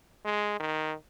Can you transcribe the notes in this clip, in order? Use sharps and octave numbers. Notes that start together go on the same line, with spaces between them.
G#3
D#3